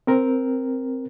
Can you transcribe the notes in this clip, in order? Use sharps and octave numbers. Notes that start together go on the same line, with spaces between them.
C4 A#4